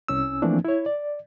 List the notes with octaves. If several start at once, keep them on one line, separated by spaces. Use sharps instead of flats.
C2 C#4 E6
E3 F3 A3 A#3 C4 D4
E4 C#5
D5